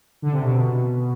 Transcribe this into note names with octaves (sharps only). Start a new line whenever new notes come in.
D3
C3
B2